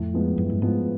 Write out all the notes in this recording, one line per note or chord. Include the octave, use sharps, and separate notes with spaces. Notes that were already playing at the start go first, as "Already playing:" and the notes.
Already playing: F2 A2
F3 G#3 B3
F#2 A2
G2
G#2 F3 G#3 B3